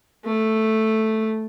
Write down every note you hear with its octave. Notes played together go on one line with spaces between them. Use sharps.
A3